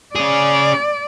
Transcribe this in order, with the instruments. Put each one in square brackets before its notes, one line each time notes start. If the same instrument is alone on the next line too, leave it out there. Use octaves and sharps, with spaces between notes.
[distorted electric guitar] C#4 G#4 [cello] D5